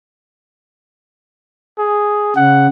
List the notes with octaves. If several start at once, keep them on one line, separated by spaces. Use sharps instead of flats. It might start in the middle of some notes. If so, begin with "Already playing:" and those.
G#4
C#3 F#5